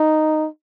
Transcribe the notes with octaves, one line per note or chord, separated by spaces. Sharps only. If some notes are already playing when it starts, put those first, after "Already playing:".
Already playing: D#4